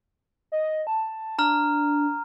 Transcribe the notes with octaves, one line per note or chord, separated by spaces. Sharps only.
D#5
A5
D4 A#5 F6